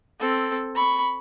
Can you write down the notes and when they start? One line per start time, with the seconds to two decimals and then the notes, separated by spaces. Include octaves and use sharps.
0.19 C4 A4
0.75 B5 C#6